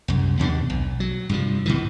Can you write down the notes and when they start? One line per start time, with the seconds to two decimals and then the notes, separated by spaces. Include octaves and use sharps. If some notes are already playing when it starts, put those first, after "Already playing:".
0.08 C2 F#2
0.39 D#2 B2 A3 D4
0.70 B1
1.00 F#3
1.29 G2 C3 F3
1.66 B2 D#3 E3